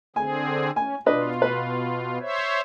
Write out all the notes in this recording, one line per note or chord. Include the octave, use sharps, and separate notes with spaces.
D3 C4 G#4 G#5
C#4 G#5
B2 D4 F4 B4 D#5
B4
C5 C#5 E5